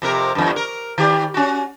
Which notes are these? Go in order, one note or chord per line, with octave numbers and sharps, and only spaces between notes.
F2 C3 A#4
E2 G2
A#4
D#3 G4 D5
C#4 F#4